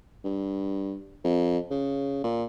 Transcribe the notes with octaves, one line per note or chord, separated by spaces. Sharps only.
G2
F2
C#3
A#2